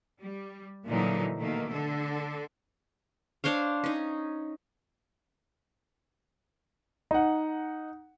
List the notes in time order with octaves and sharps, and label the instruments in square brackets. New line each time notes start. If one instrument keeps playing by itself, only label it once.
[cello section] G3
A#2 D3 E3 F#3 D#4
B2 D#3 A3 A#3
D3 A4
[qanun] D4 C5 C#5 F5
C#4 D#4
[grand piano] D#4 F#5